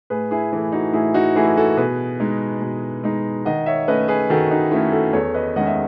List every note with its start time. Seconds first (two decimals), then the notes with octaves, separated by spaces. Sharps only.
0.10 A2 G#4 B4
0.31 E4 G#4
0.52 E3 A3 E4
0.72 D#4 F#4
0.93 A2 E4 G#4
1.14 D#4 F#4
1.35 E3 A3 E4 G#4
1.47 G#4
1.57 F#4 A4
1.77 B2 G#4 B4
2.20 G#3 D#4
2.62 B2
3.04 G#3 D#4
3.45 D#3 D#5 F#5
3.66 C#5 E5
3.88 A3 C#4 B4 D#5
4.08 G#4 B4
4.30 D#3 F#4 A4
4.51 D#4 F#4
4.71 A3 C#4 E4
4.92 F#4 A4
5.13 E2 A4 C#5
5.34 B4 D#5
5.56 D#3 G#3 C#4 D#5 F#5
5.67 E5